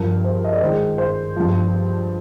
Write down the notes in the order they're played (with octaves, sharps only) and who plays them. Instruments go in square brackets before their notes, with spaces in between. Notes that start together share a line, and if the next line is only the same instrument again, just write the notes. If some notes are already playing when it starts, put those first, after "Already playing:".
Already playing: [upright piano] G2 F3 A#4
C5
D#5
D5
G#2 D#3 C5
C5
G2 F3